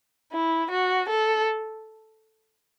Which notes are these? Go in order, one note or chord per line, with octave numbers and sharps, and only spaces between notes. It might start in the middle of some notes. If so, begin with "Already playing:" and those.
E4
F#4
A4